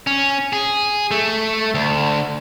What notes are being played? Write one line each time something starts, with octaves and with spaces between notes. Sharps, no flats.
C#4
G#4
A3
D2